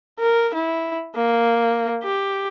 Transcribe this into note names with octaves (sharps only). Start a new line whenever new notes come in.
A#4
E4
A#3
G4